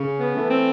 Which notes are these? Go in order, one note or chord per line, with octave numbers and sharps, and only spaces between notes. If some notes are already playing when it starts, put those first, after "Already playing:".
Already playing: C#3
B3
E3 A3
C4